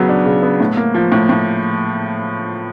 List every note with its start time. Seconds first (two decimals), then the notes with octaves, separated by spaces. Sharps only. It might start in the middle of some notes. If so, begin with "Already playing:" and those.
Already playing: C#3 F#3 B3
0.09 D4
0.26 C#3
0.43 B3
0.60 A2
0.77 A#3
0.94 F3
1.12 A2
1.29 A2